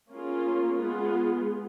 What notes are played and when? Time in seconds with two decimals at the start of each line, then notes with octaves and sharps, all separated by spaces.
0.11 A#3 C#4 F4 G#4
0.76 G#3 B3 F4 G#4